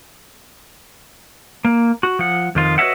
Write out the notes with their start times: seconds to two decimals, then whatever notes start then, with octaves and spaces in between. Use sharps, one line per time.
1.65 A#3
2.03 F#4
2.19 F3 F#5
2.55 F2 D#3 F4
2.78 F#4 B4 C#5 D#5 E5 F#5